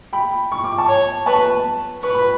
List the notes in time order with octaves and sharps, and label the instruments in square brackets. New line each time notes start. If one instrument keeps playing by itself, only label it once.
[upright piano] G5 B5
C#6
D6
A5 C#6
[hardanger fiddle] C#5
[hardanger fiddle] B4 [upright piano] A5 C#6
[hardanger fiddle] B4 [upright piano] C#6
[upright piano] B5